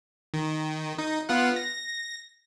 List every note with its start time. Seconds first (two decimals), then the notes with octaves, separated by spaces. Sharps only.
0.34 D#3
0.99 D#4
1.29 B3 F4 F#5
1.56 A#6